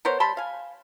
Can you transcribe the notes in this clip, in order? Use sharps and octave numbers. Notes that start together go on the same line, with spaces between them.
B3 A#4 C5 C#5
G3 A5 B5 C6
F5 G#5